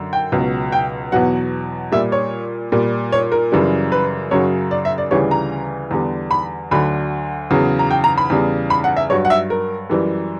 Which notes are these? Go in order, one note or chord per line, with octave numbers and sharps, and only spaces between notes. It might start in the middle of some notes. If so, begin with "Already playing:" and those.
Already playing: F#2 D3
G5
C#2 B2 F#3
G5
E2 B2 F#3 F#5
A#2 G3 E5
C#5
A#2 G3
C#5
A#4
F#2 C#3 E3 G3
B4
F#2 C#3 F#3 C#5
D5
E5
D5
D2 C#3 E3 G3 C#5
A#5
E2 D3 G3
B5
D2 D3 F#3 B5
E2 C#3 F#3
A#5
G5
A#5
B5
E2 C#3 G3
B5
F#5
E5
G2 F#3 C#5
F#5
E5
A#4
F#2 E3 G3